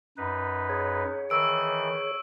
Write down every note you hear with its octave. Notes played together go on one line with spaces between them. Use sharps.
F#2 D#4 B4
G#4 C#5
D#3 E3 C#6 E6 D7